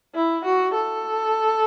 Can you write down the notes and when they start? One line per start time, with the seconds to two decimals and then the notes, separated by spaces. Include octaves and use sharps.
0.15 E4
0.45 F#4
0.74 A4